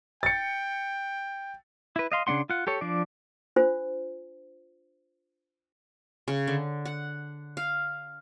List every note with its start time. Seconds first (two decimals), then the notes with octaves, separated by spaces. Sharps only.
0.23 G5 A6 C#7
1.96 E4 B4
2.12 D#5 F5 C6
2.27 C#3 C4 D4 F#5 C6
2.50 F4 F#5
2.67 G4 A4 C#5
2.81 F3 D4 D5
3.56 D4 F4 C5
6.28 C#3
6.47 D3
6.85 F#5
7.57 F5